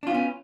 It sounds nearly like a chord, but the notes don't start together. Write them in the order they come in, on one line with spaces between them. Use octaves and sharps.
D4 F4 B3 C#4